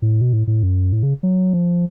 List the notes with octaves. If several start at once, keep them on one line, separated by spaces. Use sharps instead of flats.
A2
B2
A2
A2
F#2
A2
C#3
F#3
F3